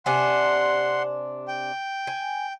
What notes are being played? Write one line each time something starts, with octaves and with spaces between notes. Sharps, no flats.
C3 D4 F#5 G#5 C6
G5
G#5